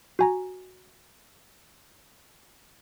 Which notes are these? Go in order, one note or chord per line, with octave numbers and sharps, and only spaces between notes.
F#4 G#5 A#5